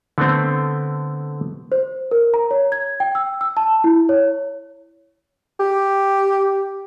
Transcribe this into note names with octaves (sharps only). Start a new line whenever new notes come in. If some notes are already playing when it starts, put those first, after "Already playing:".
D3 A3 B3 C4
C5
A#4
A#5
C#5
G#6
G5
E6
E6
A5
E4
C#5
G4